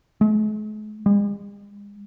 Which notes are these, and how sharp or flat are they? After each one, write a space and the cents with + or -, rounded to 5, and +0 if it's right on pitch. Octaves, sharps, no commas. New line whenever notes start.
G#3 +45
G#3 -40